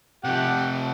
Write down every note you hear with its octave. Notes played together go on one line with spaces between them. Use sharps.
C3 F3 G4 F#5 G5